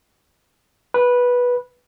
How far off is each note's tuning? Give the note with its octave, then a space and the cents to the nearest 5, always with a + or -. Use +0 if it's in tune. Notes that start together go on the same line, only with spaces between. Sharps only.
B4 -10